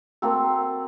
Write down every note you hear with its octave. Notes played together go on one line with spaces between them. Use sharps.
A#3 C4 F#4 A4